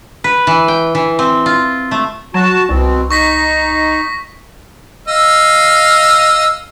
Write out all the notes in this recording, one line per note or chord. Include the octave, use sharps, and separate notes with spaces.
B4
E3
G5
E3
C4
F4
A3
F#3 F#4 A5
C2 B2 C4
D#4 C#6 A#6 B6
D#5 F5 E6